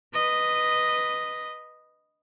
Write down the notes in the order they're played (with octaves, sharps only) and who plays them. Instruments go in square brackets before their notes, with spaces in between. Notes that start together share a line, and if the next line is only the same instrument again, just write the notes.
[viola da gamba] B4 D#5